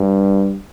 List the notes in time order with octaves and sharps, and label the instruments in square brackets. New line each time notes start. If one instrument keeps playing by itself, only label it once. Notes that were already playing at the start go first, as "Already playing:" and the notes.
Already playing: [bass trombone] G2